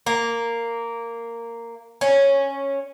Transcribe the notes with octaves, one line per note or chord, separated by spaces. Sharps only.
A#3
C#4